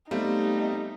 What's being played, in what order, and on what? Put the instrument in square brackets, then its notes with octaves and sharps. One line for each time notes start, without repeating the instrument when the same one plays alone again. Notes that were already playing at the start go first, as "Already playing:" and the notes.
[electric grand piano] G3 C4 [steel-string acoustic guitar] A3 [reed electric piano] B3 G4 F5 [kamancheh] D#4